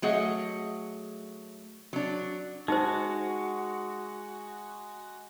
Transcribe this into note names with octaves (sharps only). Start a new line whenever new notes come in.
F#3 A3 G#4 D#5 F#5
F#3 D4
G#3 D#4 F#4 C5